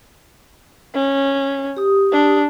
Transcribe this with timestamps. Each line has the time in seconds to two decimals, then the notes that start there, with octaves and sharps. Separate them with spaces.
0.95 C#4
1.77 G4 D#6
2.12 D4